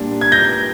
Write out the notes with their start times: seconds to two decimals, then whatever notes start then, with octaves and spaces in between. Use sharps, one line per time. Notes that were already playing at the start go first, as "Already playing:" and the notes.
Already playing: A#2 G3 D4
0.21 G#6
0.32 G6 A#6